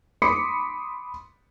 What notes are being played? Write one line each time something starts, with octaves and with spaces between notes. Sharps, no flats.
B5 C6 D6 D#6 B6 C#7